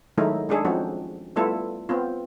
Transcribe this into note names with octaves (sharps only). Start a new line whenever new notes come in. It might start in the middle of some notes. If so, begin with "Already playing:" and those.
D#3 F#3 G#3 A3 D#4 E4
G#3 D4 D#4 G#4 A4
F3 G#3 C4 C#4 F#4
G3 A3 B3 E4 F4 A4
B3 C4 F4